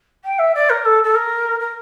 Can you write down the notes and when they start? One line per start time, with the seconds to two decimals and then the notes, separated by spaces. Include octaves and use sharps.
0.24 G5
0.38 E5
0.54 D5
0.69 A#4
0.85 A4
1.03 A4
1.14 A#4
1.59 A#4